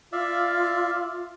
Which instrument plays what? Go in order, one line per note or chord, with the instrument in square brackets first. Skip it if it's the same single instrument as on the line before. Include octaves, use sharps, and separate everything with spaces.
[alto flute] F4 [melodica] D5 E5 F5